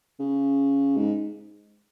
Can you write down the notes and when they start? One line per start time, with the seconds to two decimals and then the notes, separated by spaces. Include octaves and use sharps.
0.19 C#3
0.97 G#2